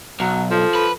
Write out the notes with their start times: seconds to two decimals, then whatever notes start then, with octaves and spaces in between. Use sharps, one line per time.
0.20 B1 F#3
0.50 F3 A4
0.75 B4